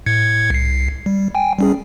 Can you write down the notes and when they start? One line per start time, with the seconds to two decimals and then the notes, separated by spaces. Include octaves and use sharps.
0.06 A2 G#6 C#7
0.50 C2 C7
1.06 G3
1.35 G5 G#5
1.59 G3 C#4 G#4